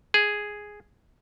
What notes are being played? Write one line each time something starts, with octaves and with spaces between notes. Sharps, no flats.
G#4